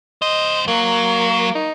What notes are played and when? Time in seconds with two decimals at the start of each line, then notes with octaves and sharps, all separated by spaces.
0.22 C#2 C5 D#5
0.68 F#3 A#3
1.55 D#4